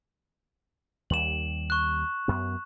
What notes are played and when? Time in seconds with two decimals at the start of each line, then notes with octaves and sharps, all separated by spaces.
1.10 D#2 G3 E7 F#7
1.70 C#6 F#6
2.28 F#2 B3